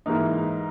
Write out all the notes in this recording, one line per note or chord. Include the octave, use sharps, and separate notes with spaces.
G#2 E3 A#3 D#4